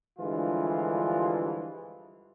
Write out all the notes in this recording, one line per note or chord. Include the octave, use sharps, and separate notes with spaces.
G2 D3 E3 F3 G#3 F4